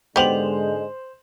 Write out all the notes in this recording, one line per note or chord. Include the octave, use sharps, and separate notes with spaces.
G#2 D3 G#3 B3 G4 C5 F7 F#7